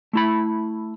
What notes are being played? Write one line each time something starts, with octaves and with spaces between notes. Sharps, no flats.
A3 E4 B5